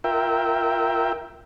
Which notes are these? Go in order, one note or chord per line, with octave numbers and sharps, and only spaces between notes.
F4 A#4 E5 G5